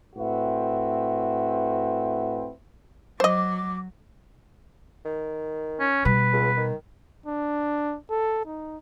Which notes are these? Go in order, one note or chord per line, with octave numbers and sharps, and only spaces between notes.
A2 C4 F#4 B4 E5
F#3 C5 D#5 D6
D#3
C#4
B2 G3 B4
C#2
D#3
D4
A4
D#4